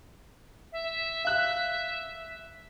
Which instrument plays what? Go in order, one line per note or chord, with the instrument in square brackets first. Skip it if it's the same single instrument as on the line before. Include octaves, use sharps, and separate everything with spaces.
[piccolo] E5
[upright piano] F5 F#6